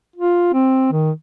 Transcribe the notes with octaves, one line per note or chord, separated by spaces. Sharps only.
F4
C4
D#3